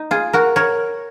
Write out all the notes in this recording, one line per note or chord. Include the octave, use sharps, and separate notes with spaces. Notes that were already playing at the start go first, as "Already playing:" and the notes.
Already playing: D#4
F4 G#4
F#4 A#4
A#4 C#5